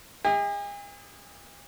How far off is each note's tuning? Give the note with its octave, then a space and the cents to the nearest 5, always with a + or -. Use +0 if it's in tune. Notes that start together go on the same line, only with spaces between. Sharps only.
G#4 -45 D#5 +45